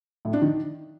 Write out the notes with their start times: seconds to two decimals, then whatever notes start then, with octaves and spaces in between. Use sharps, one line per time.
0.25 A2
0.33 D4
0.42 D#3